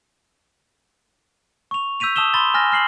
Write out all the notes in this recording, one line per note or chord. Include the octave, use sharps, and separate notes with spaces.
C#6 F7
E6 G6 B6 D#7 F7
A5 D#6 E6 E7 G7
B5 C6 A6 G7
G#5 F6 A6 A#6
F6 C7 F#7